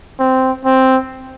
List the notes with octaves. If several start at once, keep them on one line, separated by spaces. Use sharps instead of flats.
C4
C4